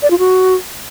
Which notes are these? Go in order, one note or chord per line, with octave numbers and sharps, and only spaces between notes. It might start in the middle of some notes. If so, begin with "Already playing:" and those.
D5
F4
F#4